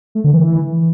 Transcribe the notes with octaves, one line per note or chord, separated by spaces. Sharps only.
A3
D3
E3